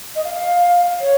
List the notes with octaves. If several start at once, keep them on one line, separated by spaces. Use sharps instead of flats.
D#5
F5
F5
C#5